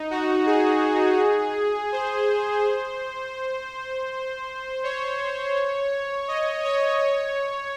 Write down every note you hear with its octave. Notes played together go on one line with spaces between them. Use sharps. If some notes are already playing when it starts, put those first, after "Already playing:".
Already playing: D#4
F#4
G#4
C5
C#5
D#5
C#5
C#5